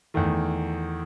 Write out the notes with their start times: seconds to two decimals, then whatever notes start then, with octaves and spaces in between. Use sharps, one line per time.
0.14 E2 D#3 A3